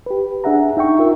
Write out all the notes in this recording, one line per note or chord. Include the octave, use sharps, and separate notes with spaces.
G4 B4
D4 G#4 E5 F#5 A#5
D#4 E5 G5 C#6
F4 A#4 E5